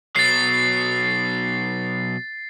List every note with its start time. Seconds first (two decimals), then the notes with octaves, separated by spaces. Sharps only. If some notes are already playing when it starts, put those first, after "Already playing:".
0.16 B2 F#3 A6 C7